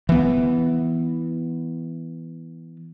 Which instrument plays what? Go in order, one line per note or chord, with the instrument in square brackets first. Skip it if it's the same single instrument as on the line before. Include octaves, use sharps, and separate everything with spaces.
[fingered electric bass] E3 B3